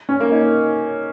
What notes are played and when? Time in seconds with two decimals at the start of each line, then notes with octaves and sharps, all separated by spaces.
0.09 C#4
0.20 A#3
0.32 D#4